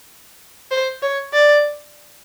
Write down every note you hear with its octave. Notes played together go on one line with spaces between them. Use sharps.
C5
C#5
D5